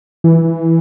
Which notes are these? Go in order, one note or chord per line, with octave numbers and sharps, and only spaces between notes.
E3